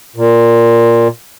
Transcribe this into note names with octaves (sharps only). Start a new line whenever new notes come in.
A#2